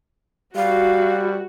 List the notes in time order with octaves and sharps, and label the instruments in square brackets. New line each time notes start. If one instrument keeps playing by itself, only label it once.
[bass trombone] G3 [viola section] F#4 [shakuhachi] F5